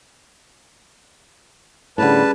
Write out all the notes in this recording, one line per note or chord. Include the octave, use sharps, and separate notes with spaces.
A2 D3 G3 C#4 G#4 B4 A5